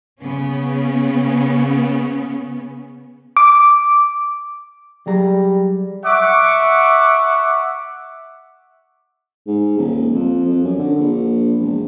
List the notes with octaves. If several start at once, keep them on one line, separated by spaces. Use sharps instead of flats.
C#3 B3 C#4
D6
F#3 G3 G#4 A#5
E5 F#5 C#6 D6
G#2
D#1
F2
F2
F#2
D3
A#1
E1